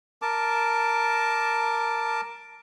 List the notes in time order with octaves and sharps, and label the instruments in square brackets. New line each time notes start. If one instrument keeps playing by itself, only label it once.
[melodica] A#4 A5 D6